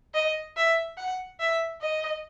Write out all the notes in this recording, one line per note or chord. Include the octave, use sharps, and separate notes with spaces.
D#5
E5
F#5
E5
D#5